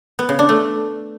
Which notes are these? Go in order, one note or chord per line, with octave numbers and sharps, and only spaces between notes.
B3
C#3
D4
A3